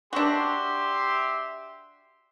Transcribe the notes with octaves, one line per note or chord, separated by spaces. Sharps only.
D4 F#4 G4 E5 C6